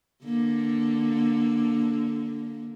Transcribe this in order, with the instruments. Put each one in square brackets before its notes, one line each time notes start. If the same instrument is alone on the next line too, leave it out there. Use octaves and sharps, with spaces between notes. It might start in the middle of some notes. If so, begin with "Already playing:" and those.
[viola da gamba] D3 A#3